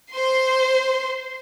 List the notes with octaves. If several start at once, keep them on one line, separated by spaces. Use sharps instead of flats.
C5 C6